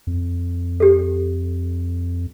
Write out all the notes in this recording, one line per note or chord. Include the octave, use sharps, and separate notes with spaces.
F2
G4 A4